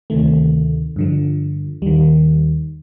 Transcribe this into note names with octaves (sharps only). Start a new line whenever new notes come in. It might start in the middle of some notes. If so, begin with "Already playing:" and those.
D2 C3 D#3 A3
G2 D3 F3
D#2 D#3 G3